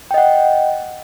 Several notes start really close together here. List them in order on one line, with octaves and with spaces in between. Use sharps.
G5 D#5 F#5